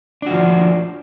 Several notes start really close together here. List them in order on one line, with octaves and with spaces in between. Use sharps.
D4 F#4 F3